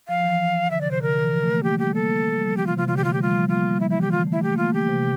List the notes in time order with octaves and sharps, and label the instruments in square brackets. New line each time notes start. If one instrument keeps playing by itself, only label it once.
[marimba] F3 [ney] F5
[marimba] F3
E3
[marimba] D3 [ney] E5
[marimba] C3 [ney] D5
[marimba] D3 [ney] C5
[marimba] D3 [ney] A#4
[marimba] E3
F3
A3
A#3
[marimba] A3 [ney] G4
[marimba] G3 [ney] G4
[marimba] A#3 [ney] A4
[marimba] G3
F3
[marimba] E3 [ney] G4
[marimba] C3 [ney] F4
[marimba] C3 [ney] F4
[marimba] D3 [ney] F4
[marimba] E3 [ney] G4
[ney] F4
[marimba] A3
[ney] G4
[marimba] G3
[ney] F4
[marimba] F3
G3
[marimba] A#3 [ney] F4
[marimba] G3
[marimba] F3 [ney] E4
[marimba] E3 [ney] E4
[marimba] D3 [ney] G4
[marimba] E3 [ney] F4
[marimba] A3
[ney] E4
[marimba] A3 [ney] G4
[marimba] A#3
[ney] F4
[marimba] A3
[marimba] E3 [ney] G4
[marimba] C3